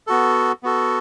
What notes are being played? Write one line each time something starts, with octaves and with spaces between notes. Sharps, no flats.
B3 F#4 A4
B3 F#4 A4